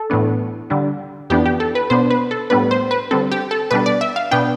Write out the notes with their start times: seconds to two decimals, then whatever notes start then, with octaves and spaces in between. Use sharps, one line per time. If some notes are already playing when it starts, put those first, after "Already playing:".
Already playing: A4
0.10 A2 E3 B3 D4
0.70 D3 G3 D4
1.30 F2 E3 B3 D4 G4
1.46 G4
1.60 A4
1.75 B4
1.90 B2 B3 D4 C5
2.11 B4
2.31 A4
2.50 A2 G3 B3 D4 B4
2.71 C5
2.91 B4
3.11 D3 G3 C4 A4
3.32 G4
3.51 A4
3.71 B2 G3 D4 B4
3.86 D5
4.01 E5
4.16 F5
4.31 B2 B3 D4 G5